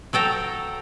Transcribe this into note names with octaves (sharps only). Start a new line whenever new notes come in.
F#3 A4 G5 A#5